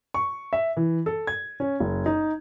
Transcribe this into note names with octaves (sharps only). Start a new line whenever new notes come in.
C#6
E5
E3
A4
G#6
C#4
F#1
D#4